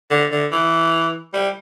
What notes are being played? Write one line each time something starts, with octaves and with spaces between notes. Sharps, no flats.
D3
D3
E3
G3